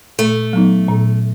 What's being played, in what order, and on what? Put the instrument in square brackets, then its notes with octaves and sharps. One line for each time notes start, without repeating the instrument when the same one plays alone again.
[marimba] A#2 [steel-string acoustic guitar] A3
[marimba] F#3 B3 D#4
A#2